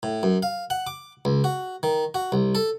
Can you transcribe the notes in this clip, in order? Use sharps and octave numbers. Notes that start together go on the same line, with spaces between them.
A2
F#2
F5
F#5
D6
C#2
F#4
D#3
F#4
C2
A4